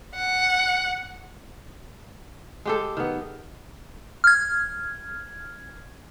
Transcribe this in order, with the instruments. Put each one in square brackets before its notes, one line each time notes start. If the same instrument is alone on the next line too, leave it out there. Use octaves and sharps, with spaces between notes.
[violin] F#5
[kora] G#3 G4 A4
D#3 B3
[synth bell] F6 G#6